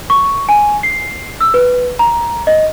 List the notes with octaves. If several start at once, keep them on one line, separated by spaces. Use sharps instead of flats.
C#6
G#5
C7
E6
B4
A#5
D#5